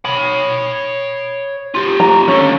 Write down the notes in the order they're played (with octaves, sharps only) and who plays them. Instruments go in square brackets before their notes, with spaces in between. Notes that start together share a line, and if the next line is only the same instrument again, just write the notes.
[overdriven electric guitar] C#5 B5
F4 G4
[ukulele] A#5
[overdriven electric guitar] D#2 D3 [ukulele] C#4